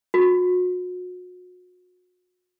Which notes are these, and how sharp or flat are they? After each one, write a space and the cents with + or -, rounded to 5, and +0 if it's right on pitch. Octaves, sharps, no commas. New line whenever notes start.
F#4 -35